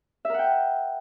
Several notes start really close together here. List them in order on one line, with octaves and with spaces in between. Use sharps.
E5 A#4 F#5 G5